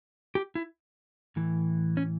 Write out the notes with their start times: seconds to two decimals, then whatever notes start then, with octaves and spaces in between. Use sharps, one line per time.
0.35 G4
0.55 E4
1.36 A2 E3
1.97 C#4